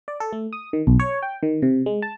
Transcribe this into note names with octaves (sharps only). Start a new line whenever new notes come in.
D5
A4
A3
D#6
D#3
B1
C#5
G5
D#3
C3
G#3
A5